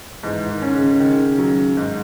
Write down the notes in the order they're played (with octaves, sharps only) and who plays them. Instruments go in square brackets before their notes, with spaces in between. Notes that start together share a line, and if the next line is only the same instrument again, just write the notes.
[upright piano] G#2 [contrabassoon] E3
[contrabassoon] D#3
[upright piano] C#4
[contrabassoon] C#3
[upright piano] D#3
F#3
G#2